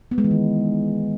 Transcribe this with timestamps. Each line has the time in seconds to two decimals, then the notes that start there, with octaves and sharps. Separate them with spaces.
0.11 B3
0.18 G#3
0.24 E3
0.31 D#3